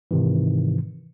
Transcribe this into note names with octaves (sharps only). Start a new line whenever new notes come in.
G#2 C3 D#3 E3